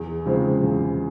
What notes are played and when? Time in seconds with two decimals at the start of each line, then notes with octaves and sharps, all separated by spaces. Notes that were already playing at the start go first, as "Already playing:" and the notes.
Already playing: E2
0.26 C#3 F3 G#3 C4
0.62 E2